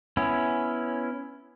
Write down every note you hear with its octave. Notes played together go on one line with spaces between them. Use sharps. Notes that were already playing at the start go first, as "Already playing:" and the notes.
B3 C#4 E4